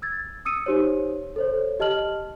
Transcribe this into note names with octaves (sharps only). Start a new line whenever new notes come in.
E6 G#6 A6
D#6 E6 C#7 D#7
D#4 G4 C5 C#5
A4 C5 C#5
G4 D#5 A5 F6 F#7